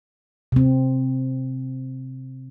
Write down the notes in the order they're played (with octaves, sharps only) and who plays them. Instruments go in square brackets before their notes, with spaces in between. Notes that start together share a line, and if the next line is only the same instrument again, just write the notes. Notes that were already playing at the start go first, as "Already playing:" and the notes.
[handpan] C3 C4